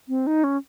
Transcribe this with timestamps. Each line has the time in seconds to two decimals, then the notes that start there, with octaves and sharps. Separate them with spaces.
0.09 C4
0.27 D#4
0.44 C#4